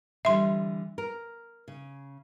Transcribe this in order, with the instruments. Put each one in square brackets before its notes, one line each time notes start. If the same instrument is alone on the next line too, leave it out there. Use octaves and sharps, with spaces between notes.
[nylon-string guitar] D3 E3 G3 [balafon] E5 C6
[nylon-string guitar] A#4
C#3